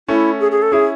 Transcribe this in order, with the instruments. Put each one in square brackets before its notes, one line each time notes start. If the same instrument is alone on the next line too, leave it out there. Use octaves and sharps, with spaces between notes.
[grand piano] A3 C#4 [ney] E4
[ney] G#4
G#4
A4
[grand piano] C#4 E4 [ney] G#4